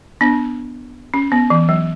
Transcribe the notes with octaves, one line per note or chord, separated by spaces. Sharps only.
B3 D4
C#4
B3
E3
F#3